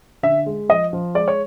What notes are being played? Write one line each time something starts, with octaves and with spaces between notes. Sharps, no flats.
D3 E5
G#3
F3 D#5
F3
G#3 D5
C#5